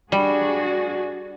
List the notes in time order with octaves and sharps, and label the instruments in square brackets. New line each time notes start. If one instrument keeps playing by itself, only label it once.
[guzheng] G3 [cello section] D4 F#4 G#4